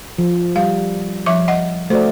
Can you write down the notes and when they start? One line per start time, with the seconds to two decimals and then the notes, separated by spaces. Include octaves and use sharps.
0.18 F3
0.56 G3 F5
1.26 F3 E5 D6
1.48 D#5 F#5
1.90 A3 F#4 C5 D5